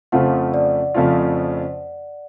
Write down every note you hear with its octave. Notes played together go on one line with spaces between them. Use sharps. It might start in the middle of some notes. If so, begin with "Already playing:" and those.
F2 C#3 F3 A3 F4 F#5
D5
F2 C#3 F3 A3 F4